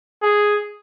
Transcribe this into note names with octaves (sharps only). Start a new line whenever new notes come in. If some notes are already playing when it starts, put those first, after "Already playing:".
G#4